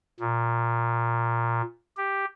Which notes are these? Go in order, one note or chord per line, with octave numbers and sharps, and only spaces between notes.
A#2
G4